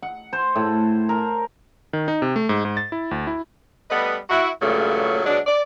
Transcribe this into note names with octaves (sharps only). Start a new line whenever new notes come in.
F#5
C5
A2
A#4
D#3
D#4
C3
A3
G#2
G#2
A6
E4
D2
E4
G3 A3 B3 B4 D#5
E4 F#4
G2 A#2 C#3 F#3 G#3 A3
B2 F#3 G#3 D4
D5